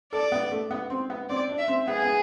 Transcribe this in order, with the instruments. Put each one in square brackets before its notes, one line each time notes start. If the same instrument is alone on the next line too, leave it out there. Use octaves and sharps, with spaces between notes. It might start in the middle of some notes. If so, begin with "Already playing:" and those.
[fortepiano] A4 [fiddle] D5
[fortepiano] B3
A3
B3
C4
B3
[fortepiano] C4 [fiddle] D5
[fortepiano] D4
[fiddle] E5
[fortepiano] C4
[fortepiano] B3 [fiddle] G#4
[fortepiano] B3